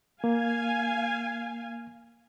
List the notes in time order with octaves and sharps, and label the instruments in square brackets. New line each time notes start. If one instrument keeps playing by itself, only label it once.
[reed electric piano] A#3 [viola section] F5 G#5